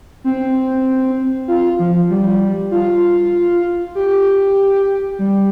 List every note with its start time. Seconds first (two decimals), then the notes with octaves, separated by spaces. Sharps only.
0.24 C4
1.48 F4
1.79 F3
2.10 G3
2.71 F4
3.95 G4
5.19 G3